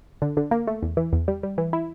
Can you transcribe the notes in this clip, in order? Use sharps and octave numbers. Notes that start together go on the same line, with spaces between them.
D3
D3
A#3
A3
E2
E3
E2
G3
G3
E3
E4